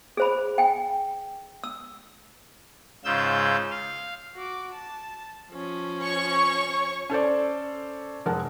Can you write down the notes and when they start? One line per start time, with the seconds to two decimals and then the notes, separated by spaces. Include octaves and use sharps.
0.17 G#4 C5 B5
0.58 G5 G#5
1.64 E6
3.05 G#2 C#3 F4 E6 G6
3.71 F5
4.35 F#4 D6
4.73 A5
5.52 F3 C#4
6.03 C#5 C#6
7.10 C#4 A4 C5 D5
8.26 F1 G#3 A#4 F#5 A5